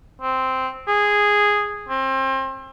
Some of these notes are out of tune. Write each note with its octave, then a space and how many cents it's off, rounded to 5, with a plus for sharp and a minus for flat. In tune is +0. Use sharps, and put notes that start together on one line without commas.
C4 -5
G#4 -10
C4 +30